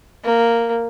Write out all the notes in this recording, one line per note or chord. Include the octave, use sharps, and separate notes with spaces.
A#3